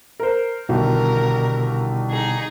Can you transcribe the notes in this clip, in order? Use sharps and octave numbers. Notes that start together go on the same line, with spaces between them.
A#4 C5
C2 B2 D3 D#3 A#4
D#4 G#4